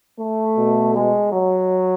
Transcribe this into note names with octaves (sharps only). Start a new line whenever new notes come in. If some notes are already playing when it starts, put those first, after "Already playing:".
A3
B2
G#3
F#3